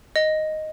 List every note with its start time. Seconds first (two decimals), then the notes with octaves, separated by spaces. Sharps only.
0.16 D#5